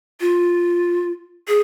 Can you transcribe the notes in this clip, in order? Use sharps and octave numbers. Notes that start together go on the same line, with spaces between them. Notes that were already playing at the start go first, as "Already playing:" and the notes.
F4
G#4